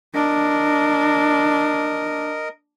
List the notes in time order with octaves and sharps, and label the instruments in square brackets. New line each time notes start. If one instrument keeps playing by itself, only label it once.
[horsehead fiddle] D4 [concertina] A#4 D#5